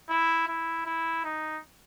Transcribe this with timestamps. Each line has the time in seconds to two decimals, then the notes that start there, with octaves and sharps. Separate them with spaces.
0.09 E4
0.48 E4
0.86 E4
1.24 D#4